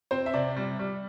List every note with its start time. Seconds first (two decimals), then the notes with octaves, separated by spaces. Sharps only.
0.11 C4 C5
0.26 E5
0.34 C3 D5
0.56 G3
0.79 G3